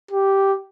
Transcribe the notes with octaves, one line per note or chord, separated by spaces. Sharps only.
G4